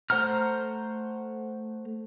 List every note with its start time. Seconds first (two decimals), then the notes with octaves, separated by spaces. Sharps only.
0.10 A3 C5 F#5 A#5 F6